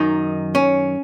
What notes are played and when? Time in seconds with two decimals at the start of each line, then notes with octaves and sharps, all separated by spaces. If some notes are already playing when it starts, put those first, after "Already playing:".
Already playing: F#2 D#3 D#4
0.55 C#4